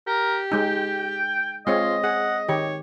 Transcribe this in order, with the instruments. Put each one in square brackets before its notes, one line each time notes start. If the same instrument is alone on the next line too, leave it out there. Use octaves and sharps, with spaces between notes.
[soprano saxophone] G4 [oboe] A#4
[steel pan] G#3 D#4 [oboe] G5
[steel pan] G#3 C4 C#5 [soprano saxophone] F4 [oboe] D#5
[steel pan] G#4 [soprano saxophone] F#5
[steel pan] D#3 G4 [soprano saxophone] C#5